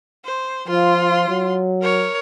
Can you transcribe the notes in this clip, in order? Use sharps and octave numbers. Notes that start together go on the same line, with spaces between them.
C5
F3 F4 C6
F#3
A#4 C#5